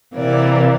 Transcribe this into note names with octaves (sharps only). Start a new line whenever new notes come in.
C3 E3 A#3 D5